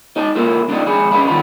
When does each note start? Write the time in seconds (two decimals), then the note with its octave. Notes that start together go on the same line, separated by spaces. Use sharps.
0.16 D#4 D#5 A5
0.35 A#3 E4 F4 A4 A#4
0.69 D4 D#4 F4 G4 D5 D#5
0.86 F2 G#3 G#4 B5
1.11 C#4 D4 B4 D#5 F5 B5
1.28 D#3 G3 B3 F4 A#5 B5